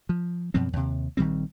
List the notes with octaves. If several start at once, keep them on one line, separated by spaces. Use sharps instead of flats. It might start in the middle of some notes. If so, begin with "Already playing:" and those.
F3
F#2 B2 F3 C4
D#2 C3
A#1 D#3 G3 C4